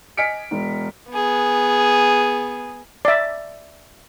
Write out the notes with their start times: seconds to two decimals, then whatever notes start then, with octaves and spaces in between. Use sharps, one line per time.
0.17 D#5 G#5 F6 B6 C#7 D7
0.51 E1
1.10 B3 G#4
3.05 D5 E5